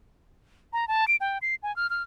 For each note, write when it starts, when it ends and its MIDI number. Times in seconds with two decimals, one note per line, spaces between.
0.73 0.88 82
0.88 1.07 81
1.08 1.16 98
1.21 1.38 79
1.42 1.55 96
1.63 1.74 80
1.76 1.90 89
1.90 2.03 89